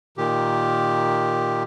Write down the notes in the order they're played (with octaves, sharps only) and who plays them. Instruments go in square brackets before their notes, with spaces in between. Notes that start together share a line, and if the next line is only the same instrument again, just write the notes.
[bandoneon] A#2 D#3 G4